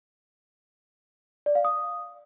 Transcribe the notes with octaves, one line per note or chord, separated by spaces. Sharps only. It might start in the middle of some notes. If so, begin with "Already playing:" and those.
D5
F5
D#6